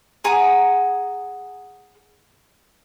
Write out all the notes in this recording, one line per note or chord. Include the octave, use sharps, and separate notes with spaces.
G#4 F#5 A#5 D#6